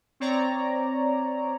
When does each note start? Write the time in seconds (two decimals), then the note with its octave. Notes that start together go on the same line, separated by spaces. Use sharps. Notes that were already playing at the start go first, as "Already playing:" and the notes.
0.20 C4 C#5 D5 A#5